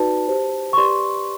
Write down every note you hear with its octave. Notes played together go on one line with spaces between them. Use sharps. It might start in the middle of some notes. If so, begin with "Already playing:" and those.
Already playing: D#4 F#4 B4 D5 A5
G4 C5
C#6
G4 B4 D5 C6